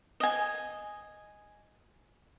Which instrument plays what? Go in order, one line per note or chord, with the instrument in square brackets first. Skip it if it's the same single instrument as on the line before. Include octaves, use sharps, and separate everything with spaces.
[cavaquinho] D#5 G#5